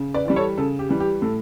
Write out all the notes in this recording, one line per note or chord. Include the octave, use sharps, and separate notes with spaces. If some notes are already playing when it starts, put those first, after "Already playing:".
Already playing: C#3
B4 D5
E3 G3 D5
A4 C#5
C#3 A4
G4
E3 G3
G4
A2 A4